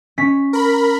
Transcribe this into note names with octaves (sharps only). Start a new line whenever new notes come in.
C#4 B6
A#4 B5